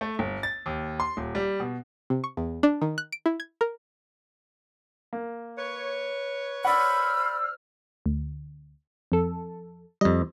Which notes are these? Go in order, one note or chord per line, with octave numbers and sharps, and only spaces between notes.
A3
G1
A6
D#2
C6
D#1
G3
B2
C3
C#6
E2
D4
D#3
F#6
D7
E4
G#6
A#4
A#3
B4 C#5
C5 D5 F#5 B5 E6 F6
D2
F2 A4
F2 G3 D#5